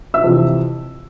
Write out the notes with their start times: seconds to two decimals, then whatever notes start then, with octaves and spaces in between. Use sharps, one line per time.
0.14 E5 E6
0.24 F2 C3 E3